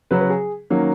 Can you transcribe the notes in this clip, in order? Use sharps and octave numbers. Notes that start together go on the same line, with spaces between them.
C#3 F#3 C#4 B4
B4
G#4
D#3 F#3 A#3 C#4